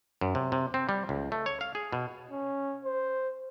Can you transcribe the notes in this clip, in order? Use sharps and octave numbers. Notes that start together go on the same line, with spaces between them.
F#2
C3
C3
C4
G3
C#2
A3
C#5
F5
G#4
B2
C#4
C5